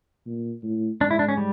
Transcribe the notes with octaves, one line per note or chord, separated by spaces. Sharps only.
A#2
A2
G#2 D4
E4
D4
C#4
G3